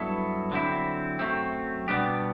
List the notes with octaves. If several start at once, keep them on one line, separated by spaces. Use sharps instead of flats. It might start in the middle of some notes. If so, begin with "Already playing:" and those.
Already playing: G2 F#3 B3 E4 A4
D3 F#3 C4 E4
F#2 F#3 A3 C4
B2 G3 B3 D4 G4